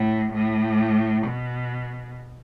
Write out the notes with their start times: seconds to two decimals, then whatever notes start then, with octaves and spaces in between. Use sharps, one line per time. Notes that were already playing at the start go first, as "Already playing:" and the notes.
Already playing: A2
0.33 A2
1.27 B2